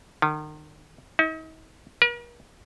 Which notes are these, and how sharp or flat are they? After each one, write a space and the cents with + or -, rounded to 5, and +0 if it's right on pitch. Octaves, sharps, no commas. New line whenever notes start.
D#3 -35
D#4 +40
A#4 +45